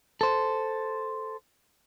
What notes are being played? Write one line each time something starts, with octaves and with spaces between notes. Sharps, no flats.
A4 C5